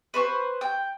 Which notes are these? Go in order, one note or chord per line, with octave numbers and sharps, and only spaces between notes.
B4 C5 C#6
G5